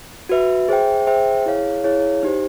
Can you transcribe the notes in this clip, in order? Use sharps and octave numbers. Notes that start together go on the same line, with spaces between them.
F#4 B4 E5
G#4 C5 E5 G5
G#4 C5 E5 G5
E4 G#4 C#5 F5
E4 G#4 C#5 F5
D#4 G4 C5